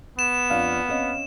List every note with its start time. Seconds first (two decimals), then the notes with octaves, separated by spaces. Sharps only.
0.19 B3 E7
0.50 F2 D4 F5
0.88 C4 C#4 D#5